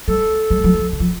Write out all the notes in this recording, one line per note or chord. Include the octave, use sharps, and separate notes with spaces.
G3 A4
G3
F#3
E3
F3
D#3
F3